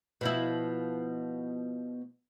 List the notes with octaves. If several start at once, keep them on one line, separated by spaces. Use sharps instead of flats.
B2 F3 E4